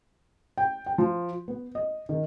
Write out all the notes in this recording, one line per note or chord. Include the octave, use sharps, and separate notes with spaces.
G5
G5
F3
B3
D#5
D#3